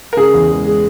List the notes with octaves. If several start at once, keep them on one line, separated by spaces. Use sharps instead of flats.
A#4
C#3 G#4
E2
G#3
G#3